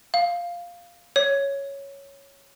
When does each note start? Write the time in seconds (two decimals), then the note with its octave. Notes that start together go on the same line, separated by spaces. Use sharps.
0.14 F5
1.16 C#5